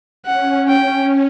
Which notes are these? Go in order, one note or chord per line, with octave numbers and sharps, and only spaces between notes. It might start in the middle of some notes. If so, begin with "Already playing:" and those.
C#4 F#5
G5